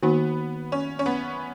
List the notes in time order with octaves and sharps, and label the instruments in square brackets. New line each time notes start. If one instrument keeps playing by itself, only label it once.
[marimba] D#3 A#3 D#4 F#4 [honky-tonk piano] B3
[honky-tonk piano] C#4
C#4
B3